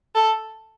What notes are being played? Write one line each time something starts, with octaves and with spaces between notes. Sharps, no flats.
A4